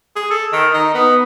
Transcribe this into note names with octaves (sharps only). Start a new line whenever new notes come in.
G#4
A4
D#3
D#4
B3